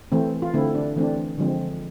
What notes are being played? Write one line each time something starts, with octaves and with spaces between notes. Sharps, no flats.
E3 A3 C4
F4
D3 A3 C4 E4
D4
E3 A3 C4 D4
D3 F3 G#3 C4